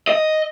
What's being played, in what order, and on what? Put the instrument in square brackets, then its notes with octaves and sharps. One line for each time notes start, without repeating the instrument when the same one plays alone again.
[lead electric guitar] D#5